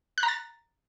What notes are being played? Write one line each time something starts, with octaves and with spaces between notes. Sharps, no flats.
F#6
A#5
A6